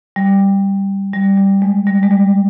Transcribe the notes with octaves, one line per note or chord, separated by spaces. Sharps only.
G3
G3
G3
G#3
G3
G#3
G3